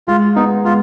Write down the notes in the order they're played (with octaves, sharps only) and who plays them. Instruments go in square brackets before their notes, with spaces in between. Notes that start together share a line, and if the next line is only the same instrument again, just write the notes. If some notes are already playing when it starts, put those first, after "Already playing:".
[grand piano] G#3 [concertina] F4
[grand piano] B3 [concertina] D#4
[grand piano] G#3 [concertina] F4